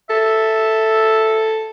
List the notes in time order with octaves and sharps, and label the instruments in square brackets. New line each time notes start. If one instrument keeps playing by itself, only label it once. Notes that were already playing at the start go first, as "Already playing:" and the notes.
[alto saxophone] A4 [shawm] E5